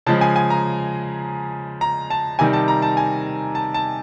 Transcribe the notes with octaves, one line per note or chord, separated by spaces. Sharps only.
C#3 F3 G#3 A5
G#5
G#5
A#5
A#5
A5
C3 D#3 G3 G#5
A5
A#5
A5
G#5
A5
A5